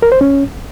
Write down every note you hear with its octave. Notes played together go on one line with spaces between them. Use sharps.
A#4
C5
C#4